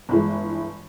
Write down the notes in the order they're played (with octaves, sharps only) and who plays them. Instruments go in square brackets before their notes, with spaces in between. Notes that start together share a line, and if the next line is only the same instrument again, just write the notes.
[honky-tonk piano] G1 E3 G#3